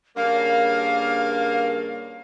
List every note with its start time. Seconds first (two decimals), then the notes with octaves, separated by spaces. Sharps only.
0.17 G2 C#3 A#3 F5